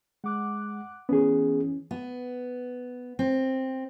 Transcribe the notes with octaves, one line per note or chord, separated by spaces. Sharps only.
G#3 F#5 D6 F#6
E3 B3 C#4 G#4
B3
C4